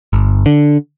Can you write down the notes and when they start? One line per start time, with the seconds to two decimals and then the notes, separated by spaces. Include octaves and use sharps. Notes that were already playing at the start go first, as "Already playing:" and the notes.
0.13 G1
0.46 D3